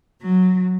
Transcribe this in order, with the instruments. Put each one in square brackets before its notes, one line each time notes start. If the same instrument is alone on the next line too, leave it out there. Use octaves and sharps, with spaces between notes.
[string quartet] F#3